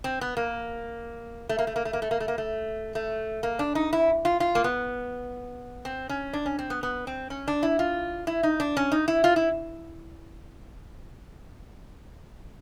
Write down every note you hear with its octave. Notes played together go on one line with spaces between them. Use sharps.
C4
B3
A#3
A3
A#3
A3
A#3
A3
A#3
A3
A#3
A3
A#3
A3
A3
A#3
D4
D#4
E4
F4
F4
A#3
B3
C4
C#4
D4
C#4
C4
B3
B3
C4
C#4
D4
E4
F4
E4
D#4
D4
C#4
D#4
E4
F4
E4